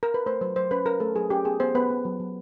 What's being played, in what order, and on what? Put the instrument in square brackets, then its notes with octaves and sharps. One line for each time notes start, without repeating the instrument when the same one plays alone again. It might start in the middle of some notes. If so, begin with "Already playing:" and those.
[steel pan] A#4
B4
A3 C5
F#3 C5
F#3 C5
C#4 B4
C#4 A#4
A3 A4
F#3 G#4
C#4 G4
B3 G#4
B3 C5
B3 B4
B3
F#3
F#3